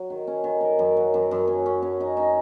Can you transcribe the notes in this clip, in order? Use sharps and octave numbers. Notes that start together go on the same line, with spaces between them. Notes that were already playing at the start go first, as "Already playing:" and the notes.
Already playing: F#3
D#3
C#4
D#3
A#4
F#2
F#3
F#2
F#2
C#4
C#4
C#4
D#4
D#4